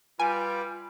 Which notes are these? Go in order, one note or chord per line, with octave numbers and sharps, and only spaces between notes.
G3 F4 B4 G#5 D6